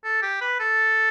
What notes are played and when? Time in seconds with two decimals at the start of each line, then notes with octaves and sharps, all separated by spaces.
0.04 A4
0.22 G4
0.41 B4
0.60 A4